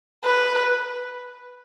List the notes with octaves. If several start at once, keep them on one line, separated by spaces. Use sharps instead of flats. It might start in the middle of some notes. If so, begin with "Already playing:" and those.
B4